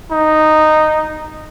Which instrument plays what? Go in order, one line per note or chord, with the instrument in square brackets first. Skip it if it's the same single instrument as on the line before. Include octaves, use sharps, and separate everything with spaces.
[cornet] D#4